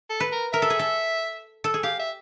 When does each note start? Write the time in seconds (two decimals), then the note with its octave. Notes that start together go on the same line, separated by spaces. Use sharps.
0.10 A4
0.20 B4
0.32 A#4
0.52 A#4 E5
0.62 A4
0.70 G#4
0.79 A4
1.64 A4
1.74 G#4
1.83 G4 F5
1.99 E5